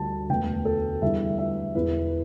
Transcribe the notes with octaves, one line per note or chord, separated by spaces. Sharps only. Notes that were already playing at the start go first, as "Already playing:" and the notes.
Already playing: D2 D3 G3 A5
E1 D2 D3 B3 G5
A4
E2 D3 G3 E5
E5
E1 E2 E3 B4